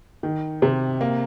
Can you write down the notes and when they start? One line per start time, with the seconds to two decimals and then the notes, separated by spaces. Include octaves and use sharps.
0.23 D#3
0.62 C3
1.01 A#3